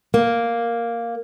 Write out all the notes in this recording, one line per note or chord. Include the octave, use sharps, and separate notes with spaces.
A#3